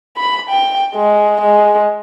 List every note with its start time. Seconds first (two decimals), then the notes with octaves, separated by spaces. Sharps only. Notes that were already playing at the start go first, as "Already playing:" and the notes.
0.17 B5
0.50 G5
0.95 G#3
1.41 G#3